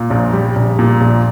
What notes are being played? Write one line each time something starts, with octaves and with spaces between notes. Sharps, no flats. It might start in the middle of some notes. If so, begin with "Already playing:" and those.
Already playing: A#2
A#1
G3
A#1
A#2
A#1